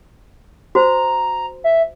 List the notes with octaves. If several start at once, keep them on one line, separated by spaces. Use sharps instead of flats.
F#4 C5 A#5
E5